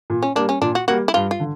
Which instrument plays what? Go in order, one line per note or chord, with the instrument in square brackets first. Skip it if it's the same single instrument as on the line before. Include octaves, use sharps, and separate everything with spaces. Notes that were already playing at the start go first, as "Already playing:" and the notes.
[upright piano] A#2
[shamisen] C#4
[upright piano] G3 A#3 [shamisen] D4
[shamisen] C#4
[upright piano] A#2 [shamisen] D4
[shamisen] F#4
[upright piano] G3 A#3 [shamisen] F#4
[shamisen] E4
[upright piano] G2 [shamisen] F4
[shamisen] F4
[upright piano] D3